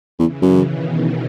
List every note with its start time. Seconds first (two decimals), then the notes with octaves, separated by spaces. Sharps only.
0.18 E2 C#3 E3
0.41 F#2
0.63 B2 D#3